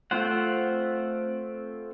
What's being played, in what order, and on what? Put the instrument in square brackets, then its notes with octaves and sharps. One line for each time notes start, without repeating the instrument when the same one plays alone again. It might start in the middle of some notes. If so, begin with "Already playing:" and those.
[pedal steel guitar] A3 C4 F4 C5 F#5